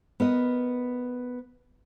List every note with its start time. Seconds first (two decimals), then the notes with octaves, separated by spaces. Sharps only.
0.20 B3 A#4 D#5